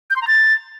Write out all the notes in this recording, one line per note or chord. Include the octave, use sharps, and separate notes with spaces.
G6
C6
A#5
A6